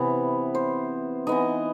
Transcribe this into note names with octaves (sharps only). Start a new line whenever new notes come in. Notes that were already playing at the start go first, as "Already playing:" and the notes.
Already playing: C3 E3 B3 B4
C5
E3 B3 D#4 D#5